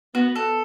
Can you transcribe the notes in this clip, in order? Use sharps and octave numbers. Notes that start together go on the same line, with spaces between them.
B3 F#4
A4